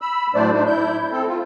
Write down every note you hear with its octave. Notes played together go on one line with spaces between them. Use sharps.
B5 E6
A2 F#3 A3 D4 C5 D5
D4 D#4 C5
E4 G6
C4 A4
F4